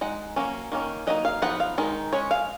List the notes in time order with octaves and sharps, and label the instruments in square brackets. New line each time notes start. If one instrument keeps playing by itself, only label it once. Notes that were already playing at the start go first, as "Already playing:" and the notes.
[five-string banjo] G#3 D#4 F#5
F#3 A#3 C#4
D#3 A#3 C#4
F#3 A#3 D#4 D#5
F5
F3 B3 D#4 F#5
F5
D#3 G#3 D#4
G#3 C#4 C#5
F5